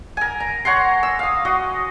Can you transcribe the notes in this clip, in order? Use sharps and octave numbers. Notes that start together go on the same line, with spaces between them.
A#4 G#5
A#5
C#5 F#5 A#5 C6
E6
F5 D#6
F#4 D#5